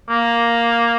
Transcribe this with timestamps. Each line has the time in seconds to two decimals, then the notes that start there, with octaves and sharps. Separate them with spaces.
0.09 A#3